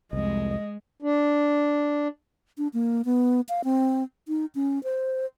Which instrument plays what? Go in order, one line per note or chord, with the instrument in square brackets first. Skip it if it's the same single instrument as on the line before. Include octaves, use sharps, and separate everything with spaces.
[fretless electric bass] C2 F2 [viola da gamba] G#3 [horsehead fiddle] D#5
[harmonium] D4
[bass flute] D4
A#3
B3
F5
C4
D#4
C#4
C5